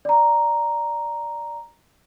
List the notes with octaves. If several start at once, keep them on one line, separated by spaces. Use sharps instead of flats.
D5 A#5